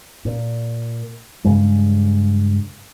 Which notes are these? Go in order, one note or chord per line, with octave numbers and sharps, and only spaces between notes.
A#2
G2 C#3 G#3